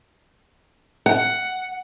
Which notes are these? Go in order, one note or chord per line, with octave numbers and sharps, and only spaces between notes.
F#5